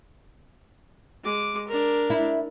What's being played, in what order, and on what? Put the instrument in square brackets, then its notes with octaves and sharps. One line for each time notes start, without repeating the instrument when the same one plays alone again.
[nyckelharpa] G#3 D6
D4 A#4
[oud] E4